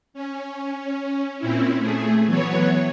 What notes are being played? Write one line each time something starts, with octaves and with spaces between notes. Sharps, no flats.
C#4
A#2 C4 C#4 E4
A3 G#4
E3 F#3 B3 C#5